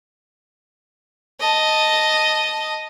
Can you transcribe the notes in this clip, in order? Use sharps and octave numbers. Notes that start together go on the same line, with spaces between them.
D#5 A5